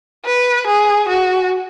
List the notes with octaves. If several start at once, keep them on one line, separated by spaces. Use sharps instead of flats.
B4
G#4
F#4